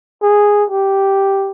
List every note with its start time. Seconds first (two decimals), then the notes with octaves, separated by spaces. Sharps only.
0.22 G#4
0.70 G4